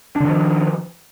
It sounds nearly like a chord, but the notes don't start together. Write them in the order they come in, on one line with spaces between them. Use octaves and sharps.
D4 D3 D#3 F3